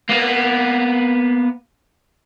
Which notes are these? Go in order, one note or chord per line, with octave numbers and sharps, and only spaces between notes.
A#3 B3